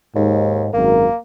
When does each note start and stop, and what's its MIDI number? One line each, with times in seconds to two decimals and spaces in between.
0.15 0.67 39
0.15 0.73 44
0.73 1.06 32
0.73 1.06 42
0.73 1.16 58
0.73 1.06 70